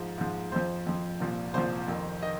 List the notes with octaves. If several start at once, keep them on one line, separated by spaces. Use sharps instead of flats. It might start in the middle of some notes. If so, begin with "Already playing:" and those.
Already playing: G#2 F3
G#2 F3
F2 F3 C5
F2 F3
C2 A#2 F3
C2 A#2 F3 C5
F2 D#3
D#3 D#5